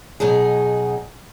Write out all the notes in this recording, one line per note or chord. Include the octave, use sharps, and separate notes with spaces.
B2 F#3 D#4 G#4